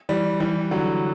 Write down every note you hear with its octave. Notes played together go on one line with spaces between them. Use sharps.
E3 G3
E3 G3
D3 F#3